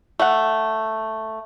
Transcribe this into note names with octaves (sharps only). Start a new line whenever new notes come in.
A3 F#5